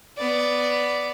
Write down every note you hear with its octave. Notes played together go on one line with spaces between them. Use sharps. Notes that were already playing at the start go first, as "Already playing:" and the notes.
B3 D5